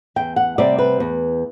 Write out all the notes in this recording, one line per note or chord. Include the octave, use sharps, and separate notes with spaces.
E2 G5
F#5
C3 G3 C4 D5
B4
E2